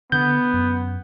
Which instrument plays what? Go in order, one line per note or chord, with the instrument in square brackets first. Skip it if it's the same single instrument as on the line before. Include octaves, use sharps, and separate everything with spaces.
[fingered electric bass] D3 [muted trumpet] B3 [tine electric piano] G6
[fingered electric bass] F#2